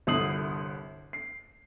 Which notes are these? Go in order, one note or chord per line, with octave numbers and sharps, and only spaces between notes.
G1 C2 D3 D#6 C7 F#7
C7